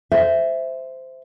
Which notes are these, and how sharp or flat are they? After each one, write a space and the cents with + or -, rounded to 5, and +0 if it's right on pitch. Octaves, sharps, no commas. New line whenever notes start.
C5 -10 E5 +0